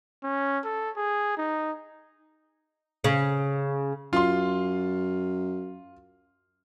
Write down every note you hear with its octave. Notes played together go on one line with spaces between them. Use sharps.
C#4
A4
G#4
D#4
C#3
F#2 F4 C6